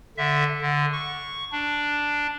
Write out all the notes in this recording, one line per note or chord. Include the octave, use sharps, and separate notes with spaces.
D3 E5
D3
C#6
D4